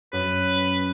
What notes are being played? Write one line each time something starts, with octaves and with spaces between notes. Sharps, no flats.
F#2 B4